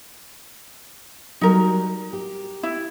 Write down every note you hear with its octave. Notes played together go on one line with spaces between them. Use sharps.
F#3 G3 D#4 A#4
G4
E4